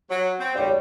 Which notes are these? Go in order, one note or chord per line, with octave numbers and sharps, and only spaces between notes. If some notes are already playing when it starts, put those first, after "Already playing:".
F#3
C4
G3 C#5 D5